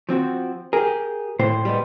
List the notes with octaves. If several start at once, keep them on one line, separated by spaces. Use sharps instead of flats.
F3 C4 F#4
G4 G#4 A#4
A2 C5 G5 C6
G3 G#3 B3